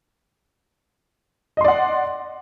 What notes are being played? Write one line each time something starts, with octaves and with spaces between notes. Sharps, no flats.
D5 D#5 F#5 C6